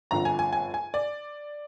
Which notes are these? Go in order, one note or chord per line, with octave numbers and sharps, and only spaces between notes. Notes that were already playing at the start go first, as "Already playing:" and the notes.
G1 F2 D3 A#5
G#5
G#5
G#5
G#5
D5